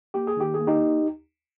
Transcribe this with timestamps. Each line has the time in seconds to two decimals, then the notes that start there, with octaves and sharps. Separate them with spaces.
0.14 A#3 G4
0.27 G#4
0.37 D#3 G4
0.54 G#4
0.59 A#3
0.67 D#4 G4